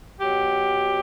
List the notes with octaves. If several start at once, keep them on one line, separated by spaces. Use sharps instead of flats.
B2 F#3 G4